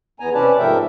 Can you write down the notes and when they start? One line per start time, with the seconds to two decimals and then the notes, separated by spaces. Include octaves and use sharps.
0.20 E2 B3 G#5 A#5
0.34 C3 C#4 B4 D5 A5
0.59 G#2 F3 A3 A#4 E5 G5